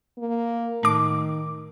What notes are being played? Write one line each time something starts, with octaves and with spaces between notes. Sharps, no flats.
A#3
A2 D#3 D6